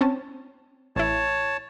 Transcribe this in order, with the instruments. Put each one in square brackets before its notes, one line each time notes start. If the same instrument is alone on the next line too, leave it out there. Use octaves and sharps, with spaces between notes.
[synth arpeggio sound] C4 C#4 A5
[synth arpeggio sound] A1 E4 [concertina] C#5 A5